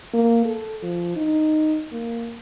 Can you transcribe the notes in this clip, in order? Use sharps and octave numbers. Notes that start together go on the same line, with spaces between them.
A#3
A4
F3
D#4
A#3